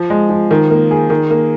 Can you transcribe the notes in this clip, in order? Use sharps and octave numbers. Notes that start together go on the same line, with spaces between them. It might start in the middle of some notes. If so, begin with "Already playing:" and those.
Already playing: F3
G#3
F3
D#3
A#3
G#4
D#3
A#3